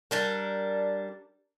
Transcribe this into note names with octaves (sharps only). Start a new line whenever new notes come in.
G3 D4 A#4